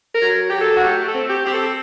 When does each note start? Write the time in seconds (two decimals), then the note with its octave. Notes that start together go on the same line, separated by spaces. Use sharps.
0.14 A#4
0.22 F#3
0.50 F#3 G4
0.61 A4
0.77 F#4
0.84 A3 G4
1.08 A4
1.15 C4
1.30 G4
1.46 C4 G4
1.54 A4